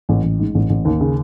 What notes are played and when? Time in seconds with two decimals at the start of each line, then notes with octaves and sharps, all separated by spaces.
0.09 A1
0.23 A1
0.39 G#2
0.55 A1
0.70 A1
0.85 D#2
1.01 C#3